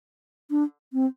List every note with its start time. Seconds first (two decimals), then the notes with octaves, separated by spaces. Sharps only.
0.51 D4
0.93 C4